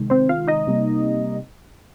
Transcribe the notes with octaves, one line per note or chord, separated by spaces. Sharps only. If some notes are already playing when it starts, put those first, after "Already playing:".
Already playing: C3 D#3 G#3
C4 C5
F4 F5
D#4 D#5
C3 G3 A#3